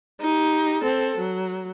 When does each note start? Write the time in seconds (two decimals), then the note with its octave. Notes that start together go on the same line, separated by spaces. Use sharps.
0.21 D#4 G4
0.82 C4 A4
1.17 F#3